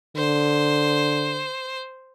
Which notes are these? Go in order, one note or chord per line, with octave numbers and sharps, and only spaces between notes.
D3 C5